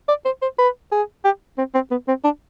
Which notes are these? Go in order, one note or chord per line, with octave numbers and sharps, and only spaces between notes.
D5
C5
C5
B4
G#4
G4
C4
C4
B3
C4
D4